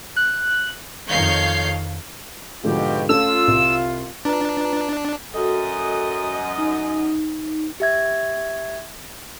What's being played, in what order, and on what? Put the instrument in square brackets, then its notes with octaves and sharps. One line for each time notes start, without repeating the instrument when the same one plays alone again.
[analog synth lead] F#6
[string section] F2 D#3 C#5 F5 G6 C7
[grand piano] G#2 D3 F3 [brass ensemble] B2 F4 G4
[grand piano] A3 C#4 A4 [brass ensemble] F4 [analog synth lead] E6
[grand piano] C2
[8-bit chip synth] D4 [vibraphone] F4 B4 A#5
[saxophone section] F#2 D#5 [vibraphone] F#4 A4
[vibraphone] D#4
[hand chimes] G4 E5 G#6